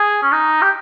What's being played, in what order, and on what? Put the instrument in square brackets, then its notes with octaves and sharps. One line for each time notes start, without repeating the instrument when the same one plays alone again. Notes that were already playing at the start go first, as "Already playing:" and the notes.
Already playing: [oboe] G#4
C#4
D#4
G4